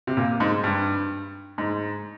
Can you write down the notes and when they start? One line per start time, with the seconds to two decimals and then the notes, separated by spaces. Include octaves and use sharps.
0.07 C3
0.17 A#2
0.40 G#2
0.64 G2
1.58 G#2